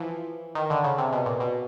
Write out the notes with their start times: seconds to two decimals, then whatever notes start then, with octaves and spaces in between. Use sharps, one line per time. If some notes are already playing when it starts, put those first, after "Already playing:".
Already playing: E3 F3
0.55 D#3
0.70 D3
0.84 C#3
0.98 C3
1.13 B2
1.26 A#2
1.40 B2